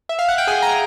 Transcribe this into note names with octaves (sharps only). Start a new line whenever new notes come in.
E5
F5
F#5
G5
G#4 G#5
A#5